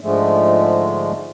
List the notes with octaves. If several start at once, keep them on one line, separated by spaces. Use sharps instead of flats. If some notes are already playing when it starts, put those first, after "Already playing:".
G#2 D3 F3 G#3 A3